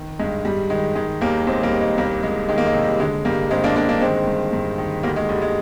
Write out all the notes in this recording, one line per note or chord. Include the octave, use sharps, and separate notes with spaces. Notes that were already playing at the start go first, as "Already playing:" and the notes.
Already playing: D#3
G2 G#3
G2 G3
D#3 G#3
D#3 G#3
D#2 G3 A#3
D#2 G#3 C4
G3 A#3
D#3
G#3
C2 G3 A#3
C2 G#3
D#3 G#3
A#3
G#3
C3
G3
D3 G#3
G2 G3 A#3
G2 G#3 C4
A#3 D4
D3 A#3 D4
A#3 D4
D#3 G#3 C4
G2
G2
D#3
D2 G3 A#3
G#3
D2 G3
G#3